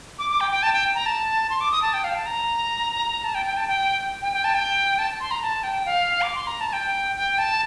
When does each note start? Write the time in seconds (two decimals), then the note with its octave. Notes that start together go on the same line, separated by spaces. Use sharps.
0.19 D6
0.30 D6
0.41 G5
0.51 G5
0.63 A5
0.73 G5
0.95 A#5
1.06 A5
1.50 C6
1.61 D6
1.71 D#6
1.82 A5
1.93 G5
2.04 F5
2.15 A5
2.26 A#5
3.24 A5
3.35 G5
3.46 G5
3.57 A5
3.68 G5
4.22 G5
4.33 G5
4.44 A5
4.54 G5
4.98 A5
5.20 C6
5.31 A#5
5.42 A5
5.63 G5
5.86 F5
6.22 D6
6.35 C6
6.47 A#5
6.60 A5
6.73 G5
7.16 G5
7.38 A5